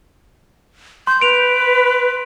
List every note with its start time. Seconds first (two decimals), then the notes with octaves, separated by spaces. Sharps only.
1.07 C6 G6
1.21 B4 D7 F7